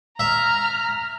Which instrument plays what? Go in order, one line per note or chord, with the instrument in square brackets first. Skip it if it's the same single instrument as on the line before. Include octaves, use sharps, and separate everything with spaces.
[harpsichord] E5 [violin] A#5 F6